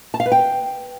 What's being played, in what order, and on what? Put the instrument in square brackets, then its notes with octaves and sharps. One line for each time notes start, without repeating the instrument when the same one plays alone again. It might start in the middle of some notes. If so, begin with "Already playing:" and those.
[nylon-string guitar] A5
F5
B4
G5